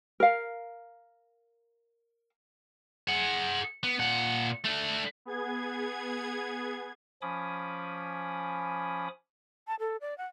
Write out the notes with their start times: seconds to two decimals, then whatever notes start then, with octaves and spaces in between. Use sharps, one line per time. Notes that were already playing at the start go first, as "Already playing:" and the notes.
0.20 A#4 F5
3.08 G#4 F#5
3.83 B3
3.99 A#2 F#5
4.65 A3 D4
5.25 B3 G#4 G#6
7.22 F3 C#4 G#5 B5 D6 D#6
9.67 A5
9.79 A4
10.01 D5
10.18 F#5